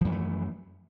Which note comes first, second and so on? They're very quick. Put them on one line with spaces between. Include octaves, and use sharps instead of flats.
F3 F#2 E3 A3